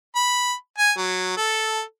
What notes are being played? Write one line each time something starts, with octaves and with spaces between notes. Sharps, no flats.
B5
G#5
F#3
A4